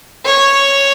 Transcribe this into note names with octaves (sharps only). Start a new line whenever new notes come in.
C#5